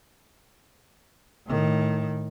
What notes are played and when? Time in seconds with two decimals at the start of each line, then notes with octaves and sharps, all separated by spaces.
1.46 A2 D#3